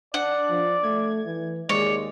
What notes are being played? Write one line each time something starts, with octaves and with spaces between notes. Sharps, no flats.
D4 D5 F#5
F3
A3 G#6
E3
D#2 G#3 C#5 D5